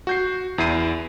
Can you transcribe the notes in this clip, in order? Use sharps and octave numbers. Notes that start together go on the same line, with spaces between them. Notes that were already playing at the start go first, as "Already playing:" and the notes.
F#4 G6 C7
E2 E4 C7 D#7